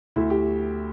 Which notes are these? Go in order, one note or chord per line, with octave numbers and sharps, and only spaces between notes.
D2 E4
G4